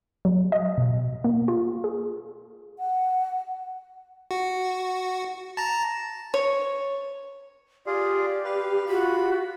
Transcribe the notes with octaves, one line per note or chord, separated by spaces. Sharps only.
F#3
D#5
B2
A#3
F4
G#4
F#5
F#4
A5 A#5
C#5
F4 G4 G#4 D5
B4 F5
F4 F#4 B5